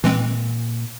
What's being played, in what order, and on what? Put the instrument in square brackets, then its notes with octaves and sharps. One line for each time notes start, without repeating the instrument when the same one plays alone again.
[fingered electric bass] A#2 [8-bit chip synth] E3 G#3 C4